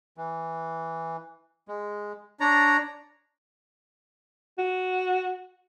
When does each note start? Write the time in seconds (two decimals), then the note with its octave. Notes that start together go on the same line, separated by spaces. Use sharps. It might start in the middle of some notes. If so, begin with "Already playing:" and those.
0.17 E3
1.68 G#3
2.40 D4 C#5 D5 A#5
4.58 F#4